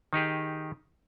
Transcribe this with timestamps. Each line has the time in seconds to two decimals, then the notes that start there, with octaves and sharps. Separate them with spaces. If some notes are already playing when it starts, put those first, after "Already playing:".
0.13 D#3 D#4 G4 G#4